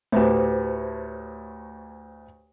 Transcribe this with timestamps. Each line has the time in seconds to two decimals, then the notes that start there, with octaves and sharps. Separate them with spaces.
0.12 D2 A2 G4 B4 C5